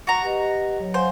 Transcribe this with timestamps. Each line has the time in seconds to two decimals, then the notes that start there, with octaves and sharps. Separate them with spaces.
0.07 F#4 A#5
0.23 G4 B4 D#5
0.80 F#3 C#5
0.94 C5 F5 F#5 G#5